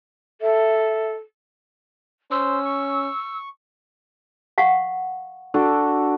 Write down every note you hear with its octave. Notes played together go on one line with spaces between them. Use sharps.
A4 E5
C#4 C5 E6
C#6
F5 F#5 C#6
D4 F#4 A4